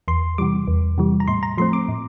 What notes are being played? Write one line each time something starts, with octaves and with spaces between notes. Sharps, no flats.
E2 C6
C3 E3 G3 D6
E2
C3 E3 G3
A#5
A2 C6
A#5
F3 A3 C4 C6
D6
A2